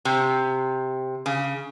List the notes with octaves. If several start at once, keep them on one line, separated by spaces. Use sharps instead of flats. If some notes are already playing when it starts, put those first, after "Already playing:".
C3
C#3